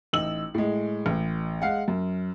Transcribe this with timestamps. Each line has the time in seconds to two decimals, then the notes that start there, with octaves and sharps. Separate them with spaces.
0.13 A1 D#4 E6 F#7
0.54 A2 G#3
1.06 A1
1.62 G#3 F5 F#5
1.88 F#2